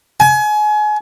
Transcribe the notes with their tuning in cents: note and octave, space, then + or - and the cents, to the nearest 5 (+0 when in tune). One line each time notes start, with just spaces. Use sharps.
G#5 +30